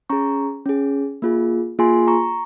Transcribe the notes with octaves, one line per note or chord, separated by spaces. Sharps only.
C#4 G#4 A#5 C#6
C#4 G#4
A#3 F4 G#4
A#3 F4 G#4 G#5 C6
A#5 C#6